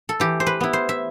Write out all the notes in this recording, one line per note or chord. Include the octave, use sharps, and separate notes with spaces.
A4
E3 G4
C5
B4
B3 E4
C5
E5